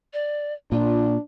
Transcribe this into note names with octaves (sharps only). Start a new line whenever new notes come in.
D5
A#2 D4 F4